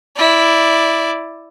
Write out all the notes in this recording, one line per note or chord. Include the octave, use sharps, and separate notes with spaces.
E4 D5